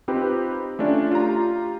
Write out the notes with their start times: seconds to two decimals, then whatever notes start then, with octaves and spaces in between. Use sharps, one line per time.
0.08 C4 D#4 F4 G4 B4
0.79 A3 C#4 D4 F4 D5
1.12 F4 G4 A#5